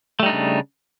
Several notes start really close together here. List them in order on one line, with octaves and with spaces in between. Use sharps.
A3 G3 D#4 D4 C#3